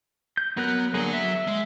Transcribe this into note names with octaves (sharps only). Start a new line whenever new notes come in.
G6
F#3 B3 A#4 F#6
D3 F#3 A#3 G#4 F#5
E5
G#3